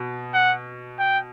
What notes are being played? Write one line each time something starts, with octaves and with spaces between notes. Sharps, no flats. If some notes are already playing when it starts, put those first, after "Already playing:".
Already playing: B2
F#5
G5